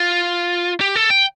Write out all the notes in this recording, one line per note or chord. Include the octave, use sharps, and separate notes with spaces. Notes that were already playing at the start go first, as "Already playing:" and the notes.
Already playing: F4
G4
A4
G5